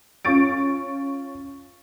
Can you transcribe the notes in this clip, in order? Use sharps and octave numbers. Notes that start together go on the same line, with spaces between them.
C#4 F4 C#6 A6 D7